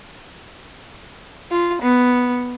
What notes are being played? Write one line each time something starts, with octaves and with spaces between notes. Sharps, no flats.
F4
B3